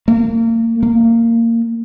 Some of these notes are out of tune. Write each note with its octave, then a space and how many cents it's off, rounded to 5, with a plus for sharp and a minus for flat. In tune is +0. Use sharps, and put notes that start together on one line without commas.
A#3 -35
A#3 -20